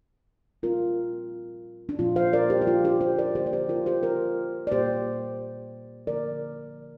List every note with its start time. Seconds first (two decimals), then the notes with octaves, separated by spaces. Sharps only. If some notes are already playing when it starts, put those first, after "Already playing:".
0.63 A#2 G3 C4 F4 A#4
1.89 D4
1.99 A#2 F3 C4 F4
2.16 C5 F5
2.33 A#4 D5
2.50 G4 C5
2.61 G4
2.67 F4
2.84 D4 G4
3.01 G4 C5
3.18 A#4 D5
3.35 D3 F3 A#3 G4 C5
3.46 D5
3.53 G4 C5
3.69 F4 A#4
3.86 G4 C5
4.03 F4 A#4
4.67 D5
4.72 A#2 A#3 G4 C5
6.07 D3 F3 A#3 A#4 D5